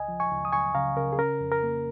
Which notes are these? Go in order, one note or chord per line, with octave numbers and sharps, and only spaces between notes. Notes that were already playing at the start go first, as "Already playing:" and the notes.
Already playing: C#2 D#5 G#5
F3
G#5 C#6
C#2
D#6
C#2 G#5 C#6
C#3 F5 A#5
C#3 A#4
G#4
C#4 A#4
F2
A#4
A#3